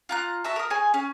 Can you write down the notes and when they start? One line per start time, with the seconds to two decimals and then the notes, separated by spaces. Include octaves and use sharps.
0.09 F4 A#5 F#6
0.44 F#4 E5 A5
0.56 A#4 D#6
0.70 G#4 C#5 G#5
0.94 C#4